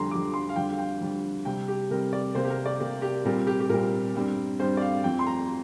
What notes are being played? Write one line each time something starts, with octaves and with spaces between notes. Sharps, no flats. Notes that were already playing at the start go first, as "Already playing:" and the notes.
Already playing: F2 D3 G3 A#5 C6
F2 D3 G3 D6
C6
F5
F2 D3 G3 G5
F5
G5
F2 D3 G3
C3 G3 C4 G5
G4
C3 G3 C4 A#4
D5
C3 A#3 C5
G4
A#4
D5
C3 A#3
G4
A#2 G3 C4 A#4
G4
G4
A#2 G3 C4 A#4
G2 G3 C4
G2 G3 C4 C5
D5
F5
F2 F3 C4 G5
C6
A#5